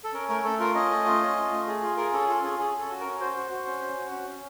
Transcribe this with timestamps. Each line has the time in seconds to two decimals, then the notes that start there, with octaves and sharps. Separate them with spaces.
0.04 A4
0.13 C#4 A#4
0.29 A3 A#4
0.44 A3 A4
0.60 F4 A#4
0.75 C#4 D#5
0.91 A3
1.06 F4
1.21 C#4
1.36 F4
1.52 A3
1.67 G#4
1.82 F4
1.97 G#4 A#4
2.13 C#4 A4
2.28 F4 A4
2.44 C#4 G#4
2.59 C#4 G#4
2.74 C#4
2.79 A4
2.90 F#4
3.00 C#4 A#4
3.20 F#4 C5
3.36 F#4
3.51 F#4
3.66 C#4
3.82 C#4
3.98 F#4
4.12 C#4
4.28 C#4